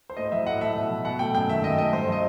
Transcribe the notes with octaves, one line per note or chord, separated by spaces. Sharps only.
C5
A2 D#5
F#3 E5
A2 F#5
A3 E5
B2
F#3
B2 F#5
A3 G5
F#2 G5
D#3 E5
F#2 D#5
A3 D#5
G2 C5
F#3 D#5